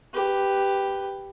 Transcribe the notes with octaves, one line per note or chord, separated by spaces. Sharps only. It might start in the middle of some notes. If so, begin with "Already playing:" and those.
G4 B4